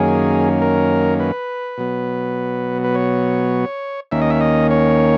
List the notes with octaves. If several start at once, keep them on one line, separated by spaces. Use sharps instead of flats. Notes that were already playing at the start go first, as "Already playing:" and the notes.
Already playing: F#2 D#3 A#3 C#4 G#4
A#4
B4
B2 F#3 B3
B4
C#5
D#2 D#3 A#3 C#4 E5
D#5
E5
D#5
C#5